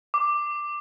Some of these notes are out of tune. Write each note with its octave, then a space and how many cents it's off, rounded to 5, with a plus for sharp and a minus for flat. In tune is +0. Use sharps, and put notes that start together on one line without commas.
D6 +10